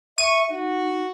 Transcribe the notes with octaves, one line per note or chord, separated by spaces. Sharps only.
E5 C#6 D#7
D#4 F#4